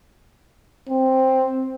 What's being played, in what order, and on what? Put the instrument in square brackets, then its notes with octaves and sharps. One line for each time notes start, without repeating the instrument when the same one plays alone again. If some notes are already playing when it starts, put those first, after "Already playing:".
[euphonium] C4